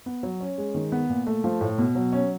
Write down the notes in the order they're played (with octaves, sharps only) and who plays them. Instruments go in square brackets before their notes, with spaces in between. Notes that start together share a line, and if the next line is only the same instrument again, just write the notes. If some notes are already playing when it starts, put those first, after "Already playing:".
[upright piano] B3
F#3
C#4
G#3
D#3
B3
A#2
A3
F3
A2
B2
F#3
C#4